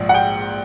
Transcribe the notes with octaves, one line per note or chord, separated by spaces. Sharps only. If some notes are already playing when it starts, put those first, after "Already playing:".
Already playing: A#1 G#2 F3
F#5
G5